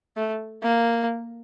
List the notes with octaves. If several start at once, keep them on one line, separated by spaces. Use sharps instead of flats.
A3
A#3